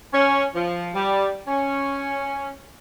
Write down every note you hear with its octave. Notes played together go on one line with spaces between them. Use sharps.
C#4
F3
G3
C#4